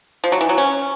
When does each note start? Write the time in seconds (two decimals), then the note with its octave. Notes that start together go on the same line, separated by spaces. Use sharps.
0.24 F3
0.32 F#3
0.41 E3
0.49 F#3
0.58 C#4